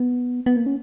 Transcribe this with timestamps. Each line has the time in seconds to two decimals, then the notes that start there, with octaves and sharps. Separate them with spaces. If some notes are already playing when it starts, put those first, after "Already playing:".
Already playing: B3
0.46 B3
0.56 A#3
0.66 C#4